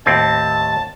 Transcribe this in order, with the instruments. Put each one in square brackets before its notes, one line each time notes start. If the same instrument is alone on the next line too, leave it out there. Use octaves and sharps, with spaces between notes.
[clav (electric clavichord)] D#2 A2 C4 [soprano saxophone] A5